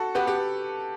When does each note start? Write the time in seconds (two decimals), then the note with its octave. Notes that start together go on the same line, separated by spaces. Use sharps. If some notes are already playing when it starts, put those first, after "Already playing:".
Already playing: F#4 A4
0.15 B3 G4 B4
0.27 G4